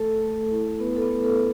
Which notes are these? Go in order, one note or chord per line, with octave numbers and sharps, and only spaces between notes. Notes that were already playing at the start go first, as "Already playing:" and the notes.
Already playing: A3 A4
A3
E4
A3 B3 B4
A4
B3 B4
A3
A4